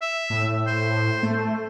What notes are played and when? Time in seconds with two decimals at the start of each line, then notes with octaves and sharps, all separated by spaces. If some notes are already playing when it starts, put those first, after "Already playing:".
0.02 E5
0.30 A2
0.67 C5
1.23 A3